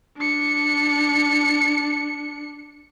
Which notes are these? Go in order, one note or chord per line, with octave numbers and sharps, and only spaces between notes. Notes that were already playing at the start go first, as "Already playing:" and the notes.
D4 C#7